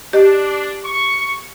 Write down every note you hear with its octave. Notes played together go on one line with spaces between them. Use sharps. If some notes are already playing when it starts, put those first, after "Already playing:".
D4 G4 D#5
C#6